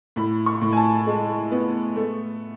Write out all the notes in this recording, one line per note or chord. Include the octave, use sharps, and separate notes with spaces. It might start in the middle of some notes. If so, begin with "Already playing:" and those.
A2 B5
C#6
A2
G#5
A5
G#3
B3
A3